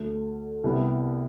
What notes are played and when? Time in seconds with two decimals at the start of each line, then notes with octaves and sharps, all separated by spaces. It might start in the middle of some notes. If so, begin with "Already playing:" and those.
Already playing: D2 D3 A3
0.64 C2 C3 G3 B3 E4